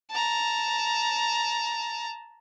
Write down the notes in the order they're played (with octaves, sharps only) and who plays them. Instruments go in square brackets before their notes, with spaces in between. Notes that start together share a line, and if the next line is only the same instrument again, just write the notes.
[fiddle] A5 A#5